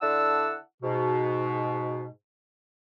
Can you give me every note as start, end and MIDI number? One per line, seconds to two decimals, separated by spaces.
0.02 0.54 50
0.02 0.54 64
0.02 0.54 74
0.02 0.54 78
0.02 0.54 81
0.02 0.54 88
0.82 2.06 44
0.82 2.06 47